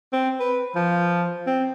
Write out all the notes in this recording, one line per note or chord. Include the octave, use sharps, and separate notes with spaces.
C4
B4
F3
C4